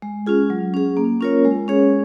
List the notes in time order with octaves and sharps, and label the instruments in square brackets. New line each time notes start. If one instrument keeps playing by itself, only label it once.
[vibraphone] G#3
C#4 F4 G#4
F#3
C#4 G#4
A#3
C#4 F4 A#4 C#5
G#3
C#4 G#4 C#5